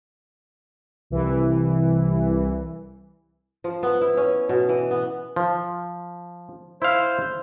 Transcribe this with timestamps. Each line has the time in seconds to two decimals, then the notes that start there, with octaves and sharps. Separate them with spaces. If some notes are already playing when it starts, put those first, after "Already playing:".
1.10 C2 E3
3.64 F3
3.83 B3
4.01 E4
4.17 C#4
4.49 B2
4.69 E3
4.91 B3
5.36 F3
6.82 E4 C5 F5